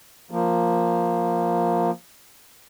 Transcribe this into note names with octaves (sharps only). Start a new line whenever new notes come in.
F3 A#3